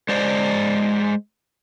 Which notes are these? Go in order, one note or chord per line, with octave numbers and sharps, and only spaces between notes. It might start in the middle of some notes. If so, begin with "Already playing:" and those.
G#3 C5 D5